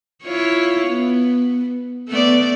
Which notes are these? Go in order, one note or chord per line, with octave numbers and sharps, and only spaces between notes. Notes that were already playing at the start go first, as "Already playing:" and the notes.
E4 F4 C#5
B3
A3 B3 D5